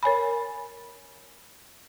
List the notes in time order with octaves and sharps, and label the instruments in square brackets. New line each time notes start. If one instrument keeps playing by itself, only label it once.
[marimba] A#4 C#5 G#5 B5